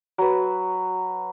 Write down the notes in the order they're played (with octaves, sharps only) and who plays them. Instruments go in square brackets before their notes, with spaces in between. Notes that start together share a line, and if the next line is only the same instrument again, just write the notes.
[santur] F#3 B4